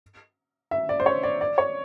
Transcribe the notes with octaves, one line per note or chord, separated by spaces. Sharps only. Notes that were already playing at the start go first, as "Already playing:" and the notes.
E5
D5
C5
C#5
D5
D5
C#5